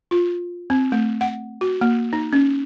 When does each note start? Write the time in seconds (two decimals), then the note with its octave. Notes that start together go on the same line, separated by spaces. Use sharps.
0.11 F4
0.70 C4
0.92 A3
1.21 F#5
1.61 F#4
1.81 A#3
2.13 D#4
2.33 C#4